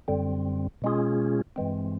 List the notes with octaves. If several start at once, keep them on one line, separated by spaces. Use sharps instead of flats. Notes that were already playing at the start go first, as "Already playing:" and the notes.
F#2 D3 G3 C4
B2 G#3 C#4 F4 G#4
G2 E3 G#3 C4